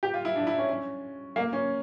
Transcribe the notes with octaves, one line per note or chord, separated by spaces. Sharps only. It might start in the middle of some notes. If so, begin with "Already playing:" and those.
G4
F4
E4
D4
E4
C#4
C#4
A#3
C#4